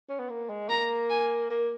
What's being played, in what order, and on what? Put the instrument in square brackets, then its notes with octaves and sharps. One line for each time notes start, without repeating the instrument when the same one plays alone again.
[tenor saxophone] C#4
B3
A#3
G#3
[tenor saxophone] A#3 [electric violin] A#5
[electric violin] G#5
[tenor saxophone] A#3